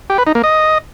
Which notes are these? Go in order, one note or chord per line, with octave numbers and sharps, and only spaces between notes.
G4
B4
D#4
A#3
D#5